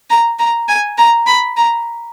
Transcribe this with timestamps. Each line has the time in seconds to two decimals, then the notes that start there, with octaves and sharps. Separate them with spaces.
0.10 A#5
0.39 A#5
0.68 G#5
0.98 A#5
1.27 B5
1.57 A#5